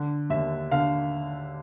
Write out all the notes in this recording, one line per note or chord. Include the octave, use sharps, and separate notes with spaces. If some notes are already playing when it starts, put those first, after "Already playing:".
Already playing: D3
D#2 E5
D3 F5